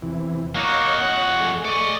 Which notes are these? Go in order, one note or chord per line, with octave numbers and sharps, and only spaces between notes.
E2 C3 E3
A#3 D#4 F#4 C#5 D#5
F2 F#4 F#5
A3 G#4
D5 D#5 C#6